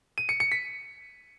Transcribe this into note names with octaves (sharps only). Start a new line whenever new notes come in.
D#7
C#7
C#7
B6